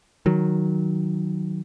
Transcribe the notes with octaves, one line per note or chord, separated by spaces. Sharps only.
D#3 F#3